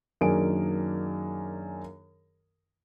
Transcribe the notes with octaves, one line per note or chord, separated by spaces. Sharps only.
F#2 D#3 A#3 D4 G#4 D7